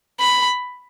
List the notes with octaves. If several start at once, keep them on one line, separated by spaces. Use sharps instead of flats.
B5